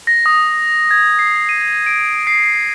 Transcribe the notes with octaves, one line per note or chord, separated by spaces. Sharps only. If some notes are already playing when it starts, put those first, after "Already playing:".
A#6
D#6
G#6
C7
D#7
D7
C7